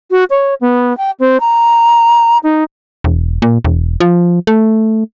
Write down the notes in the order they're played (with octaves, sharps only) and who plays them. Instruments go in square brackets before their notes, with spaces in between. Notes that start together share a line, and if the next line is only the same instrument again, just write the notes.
[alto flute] F#4
C#5
B3
G5
C4
A#5
D#4
[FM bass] E1
A#2
E1
F3
A3